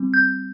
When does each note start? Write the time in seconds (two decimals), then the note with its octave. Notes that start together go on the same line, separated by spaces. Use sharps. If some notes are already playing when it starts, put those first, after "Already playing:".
Already playing: G3 C4
0.14 G6